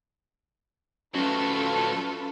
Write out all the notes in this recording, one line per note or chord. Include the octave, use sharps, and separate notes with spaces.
F#3 A3 C#4 F4 A4 B4